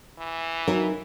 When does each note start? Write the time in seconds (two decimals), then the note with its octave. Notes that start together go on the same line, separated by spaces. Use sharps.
0.19 E3
0.67 F#3 D#4 A#4